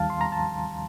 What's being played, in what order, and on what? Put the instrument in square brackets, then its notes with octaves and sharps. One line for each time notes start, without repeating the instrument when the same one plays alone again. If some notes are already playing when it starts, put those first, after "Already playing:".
Already playing: [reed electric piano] D#2 D#3 G3 F5 A5
C6
A#5
A5